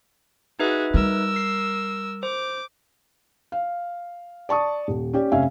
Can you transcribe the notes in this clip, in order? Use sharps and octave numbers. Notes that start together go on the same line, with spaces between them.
D#4 F#4 G#4 B4 E5
G3 A#4 E6
C7
C5 D6
F5
D5 A5 C#6 D#6
D#1
C#4 G4 D5
F1 C#4 E5 F5 G#5